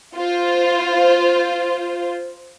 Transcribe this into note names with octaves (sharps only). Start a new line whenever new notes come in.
F4 C5